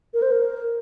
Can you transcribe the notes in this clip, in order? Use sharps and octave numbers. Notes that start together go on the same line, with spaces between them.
A#4
C5
A#4